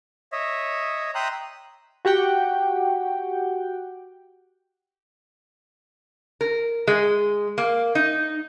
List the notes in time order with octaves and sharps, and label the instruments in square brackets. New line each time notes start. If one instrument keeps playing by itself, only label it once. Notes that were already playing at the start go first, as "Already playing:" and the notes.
[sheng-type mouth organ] C#5 D#5 E5
E5 G5 A#5 C6 D#6 F#6
[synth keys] F#4 G4 F#5 G5
[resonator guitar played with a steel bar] A#4
G#3
A#3
D#4